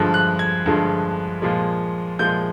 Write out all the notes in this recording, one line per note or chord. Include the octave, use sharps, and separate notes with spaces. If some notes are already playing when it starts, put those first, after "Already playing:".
Already playing: G2 D3 F3 G#3 F#6
F#6
G#6
G2 D3 F3 G#3
A#2 F3 G#3
A#2 F3 G#3 G6